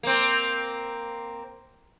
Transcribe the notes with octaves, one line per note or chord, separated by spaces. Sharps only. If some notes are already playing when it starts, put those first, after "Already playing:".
A#3 C4